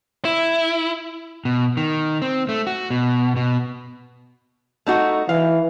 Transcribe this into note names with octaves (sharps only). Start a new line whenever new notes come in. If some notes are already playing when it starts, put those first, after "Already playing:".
E4
B2
D#3
C4
A3
F#4
B2
B2
A3 D#4 F#4
E3 F5